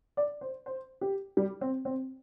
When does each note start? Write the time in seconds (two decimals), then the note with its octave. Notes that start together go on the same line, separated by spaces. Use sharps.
0.17 D5
0.41 C5
0.66 C5
1.01 G4
1.37 G3
1.61 C4
1.85 C4